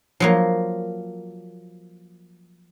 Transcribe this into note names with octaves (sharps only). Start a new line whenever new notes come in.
F3 F#3 A#3